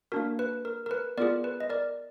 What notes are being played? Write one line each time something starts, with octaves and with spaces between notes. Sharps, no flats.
A#3 D4 F#4 A#4
B4
A#4
A#4
B4
B3 F4 G#4 A#4 D5
B4
D#5
A#4 D5